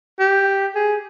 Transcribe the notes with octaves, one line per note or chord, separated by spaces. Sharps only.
G4
G#4